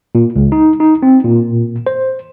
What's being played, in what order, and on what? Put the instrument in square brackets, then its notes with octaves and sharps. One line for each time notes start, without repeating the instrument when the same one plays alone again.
[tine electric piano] A#2
C#2
D#4
D#4
C4
A#2
C5